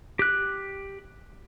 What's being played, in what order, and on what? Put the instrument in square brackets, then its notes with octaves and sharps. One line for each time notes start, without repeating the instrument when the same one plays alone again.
[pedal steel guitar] G4 F#6